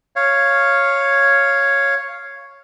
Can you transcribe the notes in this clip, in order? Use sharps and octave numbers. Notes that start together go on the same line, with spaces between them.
C#5 F5